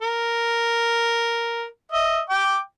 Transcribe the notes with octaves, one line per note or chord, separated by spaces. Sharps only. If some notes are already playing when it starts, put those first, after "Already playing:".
A#4
D#5 E5
G5 D6